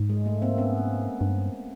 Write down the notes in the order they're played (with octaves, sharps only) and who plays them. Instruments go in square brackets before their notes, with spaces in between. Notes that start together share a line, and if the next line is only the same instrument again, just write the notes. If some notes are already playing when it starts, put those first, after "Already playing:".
Already playing: [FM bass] G#2
[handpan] G#3
A3
A#3 C4
B3 C#4
[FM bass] G2